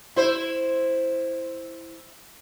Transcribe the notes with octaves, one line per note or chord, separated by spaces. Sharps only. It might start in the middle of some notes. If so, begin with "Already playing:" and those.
E4 C5